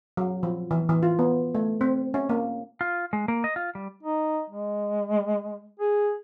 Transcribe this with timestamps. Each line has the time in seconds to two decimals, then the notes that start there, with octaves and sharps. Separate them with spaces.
0.17 F#3
0.43 F3
0.71 E3
0.89 E3
1.03 F4
1.19 B3
1.55 A3
1.81 C4
2.14 C#4
2.29 A#3
2.81 F4
3.13 G#3
3.28 A#3
3.44 D#5
3.56 F4
3.75 G3
4.03 D#4
4.50 G#3
5.79 G#4